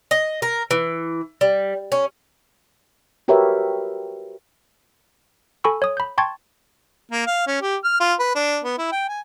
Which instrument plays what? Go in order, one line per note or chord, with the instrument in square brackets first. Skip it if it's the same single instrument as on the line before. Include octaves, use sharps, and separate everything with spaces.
[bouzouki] D#5
A#4
E3
G3
C#4
[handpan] F#4 G4 A#4 B4 C#5 E5
[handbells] A4 G#5 B5 C#6 E6
C#5 D#6
B5 G6
G5 A5 C6 C#6 G#6 A6
[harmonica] A#3
F5
C#4
G4
F6
F4
B4
D4
B3
E4
G5
G#5